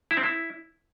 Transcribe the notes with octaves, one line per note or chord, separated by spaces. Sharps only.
E4
C4
E4